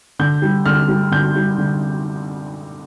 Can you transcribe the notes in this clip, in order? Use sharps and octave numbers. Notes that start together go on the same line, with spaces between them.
D3 G6
G3
D3 F6
G3
D3 G6
G3
D3